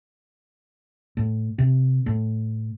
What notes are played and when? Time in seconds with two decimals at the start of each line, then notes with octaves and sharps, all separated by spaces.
1.17 A2
1.58 C3
2.06 A2